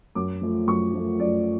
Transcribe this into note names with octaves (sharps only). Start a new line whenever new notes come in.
F#2 D6
F3 A3
F#2 C#6
F3 A3
F#2 D5